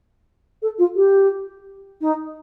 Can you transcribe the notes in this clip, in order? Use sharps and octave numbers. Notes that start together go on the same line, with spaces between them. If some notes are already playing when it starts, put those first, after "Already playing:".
A4
F4
G4
D#4